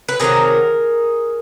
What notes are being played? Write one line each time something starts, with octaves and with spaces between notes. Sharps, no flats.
B4
C3 D#3 F#3 G#4 A#4